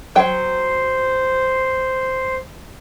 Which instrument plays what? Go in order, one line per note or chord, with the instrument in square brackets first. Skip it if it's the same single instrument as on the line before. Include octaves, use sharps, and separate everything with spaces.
[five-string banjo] F#3 G5 [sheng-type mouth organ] C5